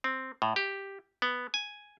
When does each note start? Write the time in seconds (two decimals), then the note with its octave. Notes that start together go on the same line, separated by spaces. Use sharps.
0.04 C4
0.42 A2
0.56 G4
1.22 B3
1.54 G#5